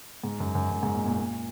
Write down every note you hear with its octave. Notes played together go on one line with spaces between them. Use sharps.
G#2
F#2
F#2
F#2
G#2
A#2
A#2
A#2